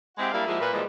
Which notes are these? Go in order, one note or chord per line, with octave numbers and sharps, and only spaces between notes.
G#3 C4 E4 G4 F#5
G3 A#3 D4 E4 D5 F5
F3 G#3 A#3 E4 F#4 G#4
A#2 B4
A#2 E3 F3 G3 G#3